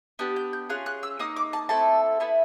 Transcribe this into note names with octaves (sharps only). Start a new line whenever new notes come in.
B3 D4 G4 F#6
G6
G6
C#4 F4 G#4 F#6
F#6
E6
A#3 D#4 D#6
D6
A5
A3 C4 E4 A4 A5
B3 E4 A4